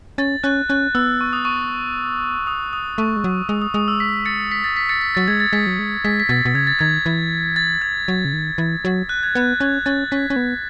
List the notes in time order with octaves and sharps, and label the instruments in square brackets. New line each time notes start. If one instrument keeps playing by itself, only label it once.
[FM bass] C#4 [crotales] A6
[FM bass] C#4 [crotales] F#6
[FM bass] C#4 [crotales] F#6
[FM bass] B3 [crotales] E6
[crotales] C#6
D#6
C#6
D#6
D#6
[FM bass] A3 [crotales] C#6
[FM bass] G#3
F#3
[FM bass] G#3 [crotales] D#6
[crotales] D#6
[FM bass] G#3 [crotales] D#6
[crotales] E6
B6
A6 C#7
B6
A6
B6
A6 C#7
B6
[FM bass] F#3 [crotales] A6
[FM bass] G#3 [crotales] G#6
[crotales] A6
[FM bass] G#3 [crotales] B6
[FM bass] F#3
G#3
[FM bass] G#3 [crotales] B6
[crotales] B6
[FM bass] B2 [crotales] A6
[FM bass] B2
[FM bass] C#3 [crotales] G#6
[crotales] A6
[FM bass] D#3 [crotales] G#6
[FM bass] E3
[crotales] A6
G#6
[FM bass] F#3
C#3
D#3
E3
F#3
[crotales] F#6
G#6
[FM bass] B3 [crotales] F#6
[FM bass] C#4 [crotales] G#6
[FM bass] C#4 [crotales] A6
[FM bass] C#4 [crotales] B6
[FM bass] C#4
B3